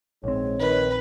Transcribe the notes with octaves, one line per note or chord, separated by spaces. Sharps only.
A#1 G#2 C4 C#5
D#3 B4